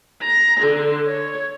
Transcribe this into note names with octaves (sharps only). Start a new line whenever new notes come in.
A#5
D3
C#5